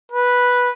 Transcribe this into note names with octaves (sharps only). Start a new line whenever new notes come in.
B4